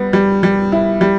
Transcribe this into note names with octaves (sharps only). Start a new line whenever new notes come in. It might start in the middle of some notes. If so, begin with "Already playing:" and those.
Already playing: G3 B3
G3
G3
E4
G3